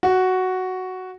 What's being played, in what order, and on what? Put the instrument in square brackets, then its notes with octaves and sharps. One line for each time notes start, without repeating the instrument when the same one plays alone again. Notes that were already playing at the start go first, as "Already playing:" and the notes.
[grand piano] F#4